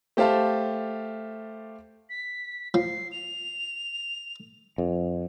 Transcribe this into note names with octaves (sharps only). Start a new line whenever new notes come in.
A3 G4 C5 F5 A5
B6
F3 C7
F7
F2